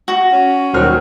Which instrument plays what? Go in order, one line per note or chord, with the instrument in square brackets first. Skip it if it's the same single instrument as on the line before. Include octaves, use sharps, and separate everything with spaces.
[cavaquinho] F#4
[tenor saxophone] C#4
[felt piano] D#1 C5 F6 [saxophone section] D#3 F#3